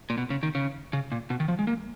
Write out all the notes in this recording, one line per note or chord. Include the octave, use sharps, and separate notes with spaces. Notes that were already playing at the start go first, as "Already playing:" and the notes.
A#2
B2
C#3
D#3
C#3
C#3
A#2
B2
D#3
F3
G#3
A#3